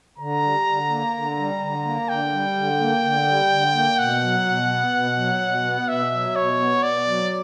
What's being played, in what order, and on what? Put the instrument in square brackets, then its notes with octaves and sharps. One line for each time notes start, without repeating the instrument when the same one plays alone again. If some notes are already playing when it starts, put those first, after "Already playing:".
[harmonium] D3 [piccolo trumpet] A#5
[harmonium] G3
D3
A#3
D3
G3
D3
A#3
[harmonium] D3 [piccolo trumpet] G5
[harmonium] G3
D3
A#3
D3
G3
D3
A#3
[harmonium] B2 [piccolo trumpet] F#5
[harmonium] F#3
B2
B3
B2
F#3
B2
B3
[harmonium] B2 [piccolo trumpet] E5
[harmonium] F#3
[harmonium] B2 [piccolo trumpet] C#5
[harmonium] B3
[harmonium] B2 [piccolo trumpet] D5
[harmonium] F#3